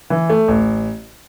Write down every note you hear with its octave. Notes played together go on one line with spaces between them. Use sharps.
E3
A3
A1